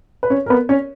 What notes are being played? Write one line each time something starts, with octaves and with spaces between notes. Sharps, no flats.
B4
C#4 C#5
A#4
B3 B4
C#4 C#5